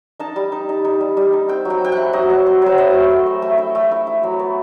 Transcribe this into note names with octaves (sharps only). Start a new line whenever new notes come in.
D#4 A5
G3
D#4
D#4
D#4
G3
G3
D#4
C4 G5
F#3 G5
F#3 G5
E4 F#5
F#3 D#5
F#3
C4
F#3 C5
E4 D#5
A3
A3
A3
A3
E4
A3
E4
E4
F#3
B3